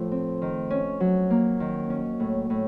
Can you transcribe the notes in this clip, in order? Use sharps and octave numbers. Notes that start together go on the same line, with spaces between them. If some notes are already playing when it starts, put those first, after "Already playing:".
Already playing: A2 F3 A3
C4
D#3
C#4
F#3
A#3
D#3
C#4
A2
A2